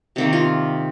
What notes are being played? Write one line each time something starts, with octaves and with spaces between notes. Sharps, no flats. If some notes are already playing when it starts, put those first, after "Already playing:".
C3 D#3 A#3
F4